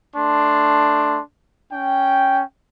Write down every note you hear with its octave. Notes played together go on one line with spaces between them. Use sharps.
A3 D4 C6
C#4 G5